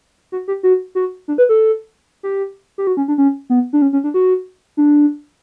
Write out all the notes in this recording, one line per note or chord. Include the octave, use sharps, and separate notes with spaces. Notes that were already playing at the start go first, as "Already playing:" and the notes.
F#4
G4
F#4
F#4
D4
B4
A4
G4
G4
F#4
C#4
D4
C#4
B3
D4
C#4
C#4
D4
F#4
D4